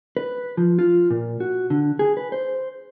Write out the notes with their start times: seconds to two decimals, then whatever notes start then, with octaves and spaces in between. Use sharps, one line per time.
0.17 B4
0.57 F3
0.79 F4
1.10 A#2
1.40 F#4
1.70 D3
1.99 G#4
2.17 B4
2.32 C5